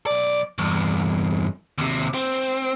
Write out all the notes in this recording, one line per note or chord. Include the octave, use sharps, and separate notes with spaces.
B1 D5
E2 G2
D#2 C3
C4